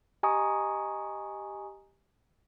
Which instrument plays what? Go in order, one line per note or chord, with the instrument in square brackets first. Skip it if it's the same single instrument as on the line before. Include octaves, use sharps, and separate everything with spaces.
[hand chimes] G4 D#5 G#5 A#5 C#6 D#6